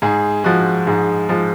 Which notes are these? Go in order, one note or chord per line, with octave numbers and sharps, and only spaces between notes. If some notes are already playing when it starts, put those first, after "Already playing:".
G#2 G#4
F3 G#3 F#4
G#2 G#4
F3 G#3